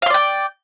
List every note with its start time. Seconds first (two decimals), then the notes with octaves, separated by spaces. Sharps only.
0.02 F5
0.06 C6
0.10 D5
0.14 G5